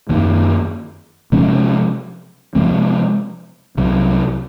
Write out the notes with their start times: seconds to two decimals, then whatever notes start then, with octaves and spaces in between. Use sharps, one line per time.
0.09 F#2 D#3 A#3
1.32 C3 F3 G#3 C#4
2.55 C3 F3 G#3 C4
3.77 C2 C3 F#3